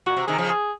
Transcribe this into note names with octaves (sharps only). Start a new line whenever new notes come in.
A#2 F#4
C3
C3 D#3 G#4
C#3 F3
G#4